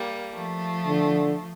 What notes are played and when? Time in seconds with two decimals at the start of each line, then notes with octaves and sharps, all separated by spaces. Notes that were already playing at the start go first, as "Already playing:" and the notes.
Already playing: G3 A#3
0.34 F3 A3
0.87 D3